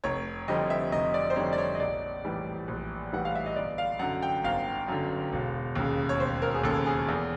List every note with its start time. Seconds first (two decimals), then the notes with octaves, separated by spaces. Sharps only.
0.04 F1 C#5
0.48 F2 D3 G3 C4 D#5
0.70 E5
0.92 F1 D#5
1.14 D5
1.30 C5
1.36 F2 D3 G3 C4 C#5
1.53 D5
1.58 C#5
1.75 D#5
1.80 A#1 D5
2.24 A2 E3 G3
2.68 A#1
3.12 A2 E3 G3 F#5
3.25 F5
3.35 E5
3.46 D#5
3.56 G1 D5
3.78 F5
3.99 F#2 D3 F#5
4.23 G5
4.44 G1 F5
4.88 F#2 D3
5.32 E1
5.75 D#2 C#3
6.09 C#5
6.20 E1 C5
6.42 A#4
6.54 G#4
6.64 D#2 C#3 A4
6.86 G#4
7.09 E2